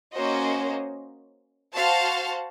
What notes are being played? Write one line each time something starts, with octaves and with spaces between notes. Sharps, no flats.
A#3 C#4 F#4 C5 D#5
F#4 C5 F5 A5